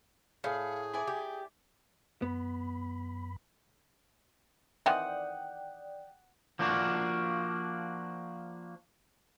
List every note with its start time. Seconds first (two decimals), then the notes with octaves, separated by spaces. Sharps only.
0.44 A2 G#4 F5
0.93 E4 D5 G#5
1.07 G4
2.22 F#2 B3 B5
4.86 D#3 E3 C4 D5 F#5 G5 D#6
6.59 F3 A#3 D4 F4 F#4